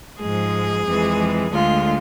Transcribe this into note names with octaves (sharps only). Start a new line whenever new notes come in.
G#2 F3 G#3 G#4
F2 E3 G#3
D2 D3 G#3 F4